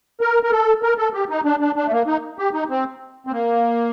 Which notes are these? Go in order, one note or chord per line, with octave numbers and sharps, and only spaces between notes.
A#4
A#4
A4
A#4
A4
G4
D#4
D4
D4
D4
A3
A#3
D#4
G4
D#4
C4
C4
A#3